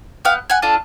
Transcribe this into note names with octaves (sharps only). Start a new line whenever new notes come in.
B3 F5 G5
F#5 G#5
D4 F4 A4